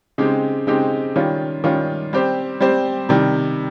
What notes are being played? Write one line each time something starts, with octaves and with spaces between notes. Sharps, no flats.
C#3 G#3 C4 D#4 G4
C#3 G#3 C4 D#4 G4
D#3 G3 C#4 F4
D#3 G3 C#4 F4
G3 C4 G4 C5
G3 C4 G4 C5
C3 D#3 G3